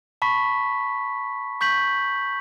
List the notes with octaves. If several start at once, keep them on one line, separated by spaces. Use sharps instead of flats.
A5 B5 C#6 B6
C#6 G6 B6 F#7